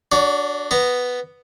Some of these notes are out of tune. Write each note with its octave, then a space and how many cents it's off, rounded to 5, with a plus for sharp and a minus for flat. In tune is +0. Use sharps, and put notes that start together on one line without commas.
D4 -5 F#4 +0 C#5 +40
B3 +0 A#5 -20